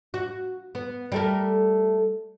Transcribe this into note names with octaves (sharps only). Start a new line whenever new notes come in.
F#4
B3
G3 A3 A#4